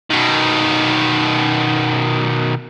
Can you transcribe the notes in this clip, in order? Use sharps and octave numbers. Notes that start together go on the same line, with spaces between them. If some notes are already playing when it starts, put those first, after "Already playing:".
B2 D#3